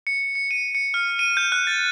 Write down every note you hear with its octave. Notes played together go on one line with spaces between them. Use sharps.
C#7
C#7
D#7
C#7
F6
D#7
G6
F#6
A6